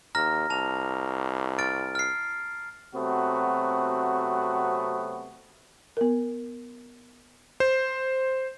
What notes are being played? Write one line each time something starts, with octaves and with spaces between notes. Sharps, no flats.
D#2 A#5 F6 A#6
C2 A5 F7
F6 A6 D7
F6 C7
C3 F#3 A3 B3 C4 F#4
B3 A#4
C5